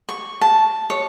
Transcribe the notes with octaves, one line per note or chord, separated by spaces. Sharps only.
C#6
A5
C#5